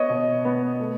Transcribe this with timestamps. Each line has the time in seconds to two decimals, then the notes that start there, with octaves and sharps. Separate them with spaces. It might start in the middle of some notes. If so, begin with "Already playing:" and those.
Already playing: B3 C#5 D#5
0.09 B2
0.45 B3
0.80 A3